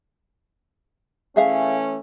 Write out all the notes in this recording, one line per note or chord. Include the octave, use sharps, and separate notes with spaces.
E3 A3 C#4 G#4 E5 F5